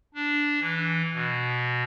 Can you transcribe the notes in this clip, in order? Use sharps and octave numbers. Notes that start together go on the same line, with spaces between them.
D4
E3
B2